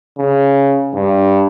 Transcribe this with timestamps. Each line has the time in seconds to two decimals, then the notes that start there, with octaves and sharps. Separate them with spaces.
0.18 C#3
0.95 G2